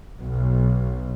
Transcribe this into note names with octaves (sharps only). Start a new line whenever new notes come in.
B1